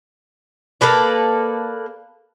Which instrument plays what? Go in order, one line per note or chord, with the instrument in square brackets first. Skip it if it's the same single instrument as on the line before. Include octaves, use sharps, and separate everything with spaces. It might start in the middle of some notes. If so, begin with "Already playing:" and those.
[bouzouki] A#3 A4 B4 D5